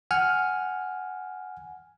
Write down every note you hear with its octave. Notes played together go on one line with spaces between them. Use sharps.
F#5 G#5 F6